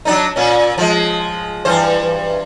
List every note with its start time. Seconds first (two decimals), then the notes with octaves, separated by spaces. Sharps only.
0.05 F#3 D4 D#4
0.36 A#2 C#4
0.78 F3 G#3
1.65 G2 E3 C5